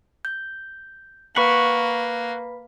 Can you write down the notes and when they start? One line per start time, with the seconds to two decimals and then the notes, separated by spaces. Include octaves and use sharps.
0.25 G6
1.36 A#3 B4 F#5 B5 C#6 B6